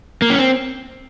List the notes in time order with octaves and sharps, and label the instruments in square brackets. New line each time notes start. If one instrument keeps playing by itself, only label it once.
[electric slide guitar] A#3
C#4
C4